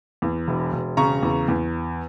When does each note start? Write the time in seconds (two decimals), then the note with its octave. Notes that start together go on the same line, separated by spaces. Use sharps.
0.22 E2
0.48 E1
0.73 E1
0.97 C#3 A#5 C#6
1.23 E2
1.48 E2